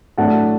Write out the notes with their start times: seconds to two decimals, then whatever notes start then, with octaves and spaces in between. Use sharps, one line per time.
0.18 A2 F#3 A3 D4 F#5 A5